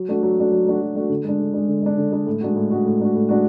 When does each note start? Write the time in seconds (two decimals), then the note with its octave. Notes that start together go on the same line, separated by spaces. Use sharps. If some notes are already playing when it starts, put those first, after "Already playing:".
Already playing: F#3
0.08 A3 D4 F#4
0.23 F#3
0.38 A3 D4 F#4
0.52 F#3
0.66 A3 D4 F#4
0.81 F#3
0.95 A3 D4 F#4
1.10 D3
1.24 G#3 D4
1.39 D3
1.54 G#3 D4
1.68 D3
1.82 G#3 D4
1.97 D3
2.12 G#3 D4
2.26 A2
2.41 G#3 D4 F#4
2.56 A2
2.71 G#3 D4 F#4
2.86 A2
3.00 G#3 D4 F#4
3.15 A2
3.29 G#3 D4 F#4